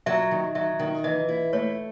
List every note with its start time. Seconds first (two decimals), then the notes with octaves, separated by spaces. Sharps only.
0.06 F#3 E5
0.31 D#3
0.55 F#3 E5
0.79 D#3
1.04 E3 D#5
1.29 E4
1.53 A3 C#5